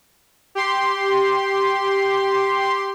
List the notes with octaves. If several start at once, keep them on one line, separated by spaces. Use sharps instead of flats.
G4 C6